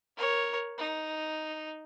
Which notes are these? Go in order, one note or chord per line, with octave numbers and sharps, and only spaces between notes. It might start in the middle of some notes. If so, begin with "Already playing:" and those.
A#4 C#5
D#4